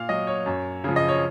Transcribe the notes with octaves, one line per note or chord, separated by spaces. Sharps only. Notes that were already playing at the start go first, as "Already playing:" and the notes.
Already playing: A#2 F5
F#3 D#5
C#5
F#2
C#3 F3
D#5
C#5